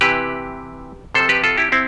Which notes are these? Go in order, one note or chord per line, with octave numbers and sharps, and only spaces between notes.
C3 E3 G4 B4
C3 F3 A4 C5
G4 B4
F4 A4
E4 G4
C4 E4